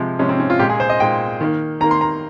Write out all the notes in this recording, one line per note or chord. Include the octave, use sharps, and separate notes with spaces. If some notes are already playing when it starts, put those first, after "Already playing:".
Already playing: C3 F3 G#3
C3 F3 G#3 C#4
C4
C#4
F4
A#2 G#3 G4
G#4
C5
D#5
A#2 G#3 G5
D#3 A#3
D#3 A#3 A#5
C6
A#5